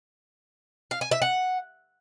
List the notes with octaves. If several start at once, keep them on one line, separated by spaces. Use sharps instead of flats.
F5
G#5
E5
F#5